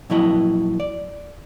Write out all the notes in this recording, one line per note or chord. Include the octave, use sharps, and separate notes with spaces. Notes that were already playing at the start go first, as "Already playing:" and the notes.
A#2 F3 F#3 E4 D#5
D5